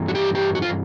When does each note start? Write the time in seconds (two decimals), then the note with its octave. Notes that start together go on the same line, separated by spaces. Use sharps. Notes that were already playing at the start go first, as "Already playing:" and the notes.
Already playing: G2 E3
0.08 F#4
0.15 G4
0.35 G4
0.55 F#4
0.62 F4